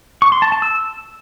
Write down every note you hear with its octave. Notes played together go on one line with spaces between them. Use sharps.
C#6
C6
A5
A5
E6